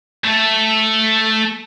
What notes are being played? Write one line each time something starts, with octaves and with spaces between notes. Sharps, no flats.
A3 A4